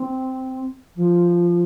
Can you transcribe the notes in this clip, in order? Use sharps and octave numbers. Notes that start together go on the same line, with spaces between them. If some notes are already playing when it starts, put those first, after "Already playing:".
Already playing: C4
F3